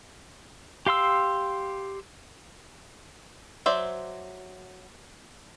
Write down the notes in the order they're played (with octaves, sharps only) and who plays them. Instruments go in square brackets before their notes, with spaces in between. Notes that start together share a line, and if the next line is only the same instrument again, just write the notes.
[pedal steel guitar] G4 F5 C6 E6
[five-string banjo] F#3 C5 D5 E5